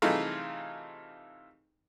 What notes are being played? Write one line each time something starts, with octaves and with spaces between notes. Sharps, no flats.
C3 E3 A3 D#4 F4 G#4